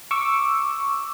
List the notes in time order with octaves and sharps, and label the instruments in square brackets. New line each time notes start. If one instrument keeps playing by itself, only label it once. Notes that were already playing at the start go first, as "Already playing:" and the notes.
[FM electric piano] C#6 D6 E6